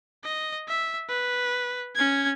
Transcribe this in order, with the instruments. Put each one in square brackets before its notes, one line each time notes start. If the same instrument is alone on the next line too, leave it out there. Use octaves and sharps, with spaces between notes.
[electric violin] D#5
E5
B4
C#4 G#6